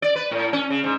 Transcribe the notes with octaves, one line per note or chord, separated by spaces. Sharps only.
D5
B4
A2
C#4
C#3
G#2